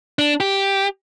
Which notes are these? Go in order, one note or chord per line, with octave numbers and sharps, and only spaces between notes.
D4
G4